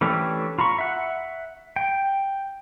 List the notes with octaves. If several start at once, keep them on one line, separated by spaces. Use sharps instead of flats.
E3 A3 C#4 D4 G4
F4 A#5 B5 C#6
E5 F#5
G5